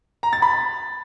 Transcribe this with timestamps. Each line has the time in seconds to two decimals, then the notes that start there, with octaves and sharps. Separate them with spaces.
0.23 A#5
0.33 A6
0.42 B5